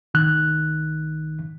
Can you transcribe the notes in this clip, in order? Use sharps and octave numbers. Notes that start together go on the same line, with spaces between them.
C2 D#3 F#6